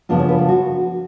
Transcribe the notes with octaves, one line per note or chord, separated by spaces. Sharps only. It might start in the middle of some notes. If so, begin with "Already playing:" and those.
C#3 F3 B3 D4 F4 F5
C#5
B4
A4
F#4